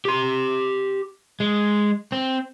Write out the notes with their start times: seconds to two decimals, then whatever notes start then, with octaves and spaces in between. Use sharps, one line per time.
0.05 G4 C6
1.40 G#3
2.12 C4